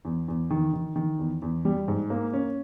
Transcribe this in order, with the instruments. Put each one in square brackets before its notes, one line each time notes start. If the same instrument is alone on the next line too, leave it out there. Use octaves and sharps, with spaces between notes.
[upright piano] E2
E2
D#3
D#3
D#3
E2
E2
G3
G#2
A#3
C#4